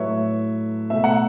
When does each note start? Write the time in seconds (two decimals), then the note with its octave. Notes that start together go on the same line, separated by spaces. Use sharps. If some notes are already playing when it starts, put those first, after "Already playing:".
Already playing: A2 F#3 A3 B4 C#5 E5
0.90 B2 A3 E5
1.04 F#5